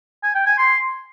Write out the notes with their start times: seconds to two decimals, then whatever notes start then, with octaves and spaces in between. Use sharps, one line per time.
0.23 G#5
0.35 G5
0.47 G#5
0.58 C6